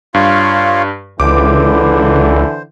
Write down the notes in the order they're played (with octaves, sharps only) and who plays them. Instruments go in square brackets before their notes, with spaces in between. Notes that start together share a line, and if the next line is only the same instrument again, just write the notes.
[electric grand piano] G2 [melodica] F4 C#5 F5
[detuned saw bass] C#2 [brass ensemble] D3 E3 [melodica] C5 [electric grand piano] D6